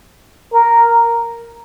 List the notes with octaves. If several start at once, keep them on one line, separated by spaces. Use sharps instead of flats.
A#4